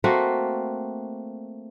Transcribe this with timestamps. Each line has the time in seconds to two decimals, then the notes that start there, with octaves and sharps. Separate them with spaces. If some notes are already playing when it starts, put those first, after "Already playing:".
0.04 A3 A#3 C4 F#4